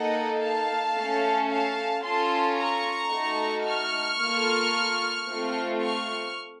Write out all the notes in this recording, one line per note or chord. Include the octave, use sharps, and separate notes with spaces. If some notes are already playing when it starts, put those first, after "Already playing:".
Already playing: A#3 D#4 A4 D#5 F#5
F5 A5
A3 C#4 A4
F5 A5
C#4 F4 A4 A5 C6
A#5 C#6
A3 D#4 F#4 A4
C#6 F6
A#3 F4 A4
A3 C4 F4 A4
C#6 F6